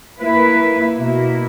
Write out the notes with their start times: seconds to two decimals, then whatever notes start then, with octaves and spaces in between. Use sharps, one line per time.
0.20 A#3 E4 B4
0.96 B2 A#3 E4